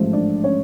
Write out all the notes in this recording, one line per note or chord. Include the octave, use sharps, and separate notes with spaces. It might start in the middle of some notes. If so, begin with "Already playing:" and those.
Already playing: A1 G#2 F3 A3
D4 D5
C#4 C#5